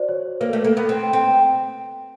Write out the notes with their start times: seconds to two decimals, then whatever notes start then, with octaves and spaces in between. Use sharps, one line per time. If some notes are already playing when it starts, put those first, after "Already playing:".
Already playing: F#4 C5 D5
0.08 C#5
0.41 A#3 B4
0.53 A3
0.64 A#3
0.77 B3
0.89 C4
1.13 C4